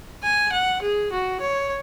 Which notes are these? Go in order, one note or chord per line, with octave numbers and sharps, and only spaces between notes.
G#5
F#5
G#4
F#4
C#5